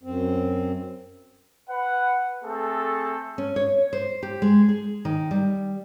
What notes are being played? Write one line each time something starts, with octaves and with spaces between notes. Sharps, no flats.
F#2 C4
B4 F#5
A3 C4 G#4 A4
C#4
C#5
C5
G4
G#3
G#4
D#3
G3